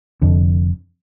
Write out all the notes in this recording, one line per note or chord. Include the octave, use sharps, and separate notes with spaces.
F1 F2 D3